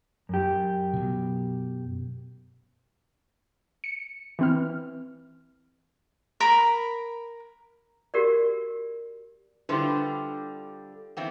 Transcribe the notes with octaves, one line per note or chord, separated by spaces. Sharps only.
F#2 G4
B2 F#3
C#7
E3 C4 F6
A#4 A#5 B5
F#4 G4 A#4 D5
D3 G3 E4 F4 G4 B4 C5
E3 B3 C4